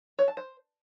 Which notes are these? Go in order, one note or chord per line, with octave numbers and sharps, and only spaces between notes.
C#5
A5
C5